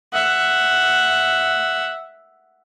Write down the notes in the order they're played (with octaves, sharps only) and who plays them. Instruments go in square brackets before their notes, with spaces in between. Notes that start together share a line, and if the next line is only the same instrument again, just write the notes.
[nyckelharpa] E5 F#5